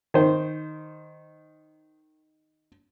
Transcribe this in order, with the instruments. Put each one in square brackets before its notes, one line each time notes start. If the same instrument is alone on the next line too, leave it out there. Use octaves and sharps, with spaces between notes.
[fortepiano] D#3 C5